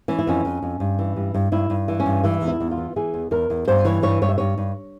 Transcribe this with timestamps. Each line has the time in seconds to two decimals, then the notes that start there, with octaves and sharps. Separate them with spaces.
0.08 E3 C#4
0.19 E4
0.27 F2 C#4
0.45 F2
0.62 F2
0.80 G2
0.99 E3
1.16 G2
1.35 G2
1.52 G2 E4
1.70 G2
1.88 E3
2.00 C#4
2.06 G2
2.23 E3 E4
2.42 E2
2.48 E4
2.60 E2
2.71 F4
2.78 E3
2.96 E3 G#4
3.14 E2
3.31 E2 A#4
3.50 E2
3.68 G2 C5
3.85 E3 C#5
4.02 G2 C#5
4.22 G2 C#5
4.29 E5
4.38 G2 C#5
4.58 G2